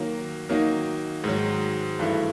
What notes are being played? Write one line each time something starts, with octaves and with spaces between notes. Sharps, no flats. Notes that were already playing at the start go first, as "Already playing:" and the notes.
Already playing: D#3 F#3 A#3
D#3 F#3 A#3 D#4
G#2 D#3 F#3
G2 E3 A3